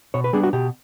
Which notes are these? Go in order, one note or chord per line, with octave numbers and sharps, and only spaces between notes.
B2 C#5
B4
G3 B3 D4 G#4
F#4
B2 G4